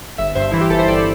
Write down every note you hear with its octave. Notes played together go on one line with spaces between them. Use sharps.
G1 E5
G2 C5 E5
E3 E4
G4
G1 A4
C5
G1 A4 D5